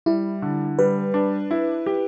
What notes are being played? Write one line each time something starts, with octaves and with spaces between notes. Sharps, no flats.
G3 E4
D3
G3 B4
D4
E4
G4